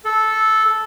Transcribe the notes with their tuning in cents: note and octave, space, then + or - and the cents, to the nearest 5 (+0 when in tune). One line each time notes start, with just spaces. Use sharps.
A4 -10